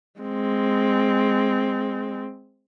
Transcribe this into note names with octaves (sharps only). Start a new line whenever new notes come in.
G#3 C4